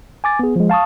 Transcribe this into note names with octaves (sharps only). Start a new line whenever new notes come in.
G#5 D6 A6
B3 G#4
F3 G#3
F5 A5 C#6 D#6